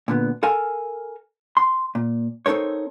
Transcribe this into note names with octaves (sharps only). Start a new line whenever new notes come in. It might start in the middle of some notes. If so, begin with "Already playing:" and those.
A#2 D3 B3
A4 A#4 F5 G#5
C6
A#2
C4 D#4 A4 A#4 C#5